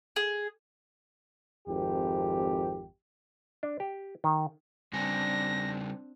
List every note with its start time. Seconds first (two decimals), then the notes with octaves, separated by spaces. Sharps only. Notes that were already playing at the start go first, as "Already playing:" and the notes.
0.16 G#4
1.67 G#1 F2 G4
3.63 D4
3.80 G4
4.24 D#3
4.93 C#3 G3 C4 D4 G#5 A#6